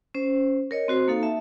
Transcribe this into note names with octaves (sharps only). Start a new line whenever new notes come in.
C#4 C5
A#4 C#5 D#5
C4 F#4 C5
A#3 D#4 A4 F5
E5 A5